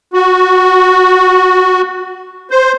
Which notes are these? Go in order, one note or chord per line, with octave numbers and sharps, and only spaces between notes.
F#4
C5